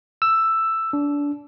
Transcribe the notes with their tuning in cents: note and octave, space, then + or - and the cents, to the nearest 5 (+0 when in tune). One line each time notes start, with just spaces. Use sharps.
E6 +5
D4 -25